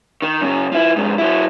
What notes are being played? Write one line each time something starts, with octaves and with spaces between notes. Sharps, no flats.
D#3
F#2 C#3
F3 E4
F2 G#2
F#3 E4